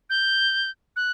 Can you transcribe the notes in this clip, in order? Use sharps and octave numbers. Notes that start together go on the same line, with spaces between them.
G6
F#6